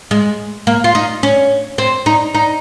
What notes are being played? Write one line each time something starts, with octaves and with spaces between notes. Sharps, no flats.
G#3
A#3
F4
D#4
C#4
C4
D#4
D#4